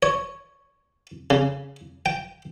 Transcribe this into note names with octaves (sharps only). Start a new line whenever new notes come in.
C#5
C#3
G5